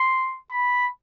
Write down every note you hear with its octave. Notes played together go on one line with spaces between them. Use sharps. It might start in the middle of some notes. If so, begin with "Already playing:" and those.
Already playing: C6
B5